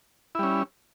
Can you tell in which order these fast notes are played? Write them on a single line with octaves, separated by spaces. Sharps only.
E4 G3 C#4